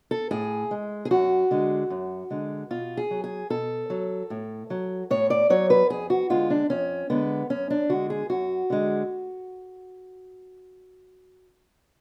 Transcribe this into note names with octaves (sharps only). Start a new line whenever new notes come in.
A4
A2 G#4
G#3
G#4
F#2 F#4
D3 G#3
F#2
D3 G#3
B2 F4
G#4
F#3
G#4
B2 A4
F#3
A2
F#3
A2 C#5
D5
F#3 C#5
B4
F2 G#4
F#4
D3 G#3 F4
D4
F2 C#4
D3 G#3 B3
F#2 C#4
D4
D3 G#3 F#4
G#4
F#2 F#4
D3 G#3